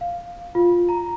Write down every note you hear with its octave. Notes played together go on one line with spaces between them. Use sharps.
F5
F4
A#5